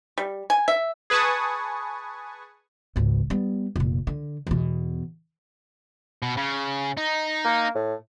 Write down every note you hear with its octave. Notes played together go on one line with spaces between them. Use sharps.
G3
G#5
E5
G#4 B4 G#5 A5 C#6 D#6
G#1 C#2
G3 B3
F1 A#2
D3
E2 B2
B2
C#3
D#4
A#3
A2